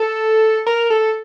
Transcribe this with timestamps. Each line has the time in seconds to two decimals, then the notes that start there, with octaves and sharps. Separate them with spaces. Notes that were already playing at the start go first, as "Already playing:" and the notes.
Already playing: A4
0.66 A#4
0.90 A4